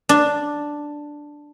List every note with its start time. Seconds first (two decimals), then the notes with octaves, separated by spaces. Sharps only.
0.09 D4